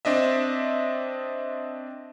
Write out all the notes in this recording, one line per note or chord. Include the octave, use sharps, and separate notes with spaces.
C4 D4 D#5 E5